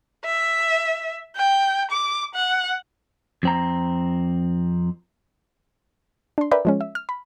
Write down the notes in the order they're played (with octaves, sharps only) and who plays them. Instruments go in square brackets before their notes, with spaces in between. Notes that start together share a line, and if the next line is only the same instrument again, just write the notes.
[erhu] E5
G5
D6
F#5
[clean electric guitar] F2 C4 A#5
[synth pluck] D4 C6
A#4 B4 D5 E5 G5 B5
F3 G#3 C#4
E5
F6
B5